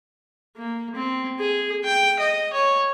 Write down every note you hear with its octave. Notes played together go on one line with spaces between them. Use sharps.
A#3
C4
G#4
G5
D#5
C#5